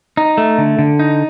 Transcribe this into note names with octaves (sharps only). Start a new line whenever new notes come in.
D#4
A3
D3
D3
D#4